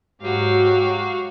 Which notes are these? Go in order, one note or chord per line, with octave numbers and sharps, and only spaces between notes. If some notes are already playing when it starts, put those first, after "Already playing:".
G#2 F#3 F#4 G4 F5